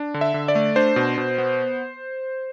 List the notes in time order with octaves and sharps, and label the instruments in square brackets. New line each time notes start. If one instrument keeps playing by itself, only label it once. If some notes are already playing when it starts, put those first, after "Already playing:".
Already playing: [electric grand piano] D4
D3
E5
D3
D5
A3
D4 C5
B2
B2
B3